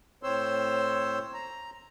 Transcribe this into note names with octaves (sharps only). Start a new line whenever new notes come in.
A2 C4 C5 C#5 C6 E6
A#5